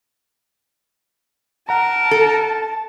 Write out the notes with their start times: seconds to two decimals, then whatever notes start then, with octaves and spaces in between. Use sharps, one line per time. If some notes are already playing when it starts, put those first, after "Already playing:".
1.69 A#4 F#5 A5 A#5
2.11 A4